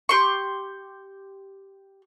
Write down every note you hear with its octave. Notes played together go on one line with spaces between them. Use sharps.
G4 C6 C#6